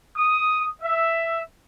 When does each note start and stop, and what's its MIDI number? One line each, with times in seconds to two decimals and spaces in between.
0.17 0.66 87
0.83 1.40 76